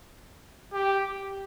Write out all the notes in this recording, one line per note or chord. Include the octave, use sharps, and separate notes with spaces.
G4